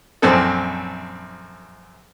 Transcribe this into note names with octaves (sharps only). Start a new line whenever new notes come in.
A#1 F#2 C4 A4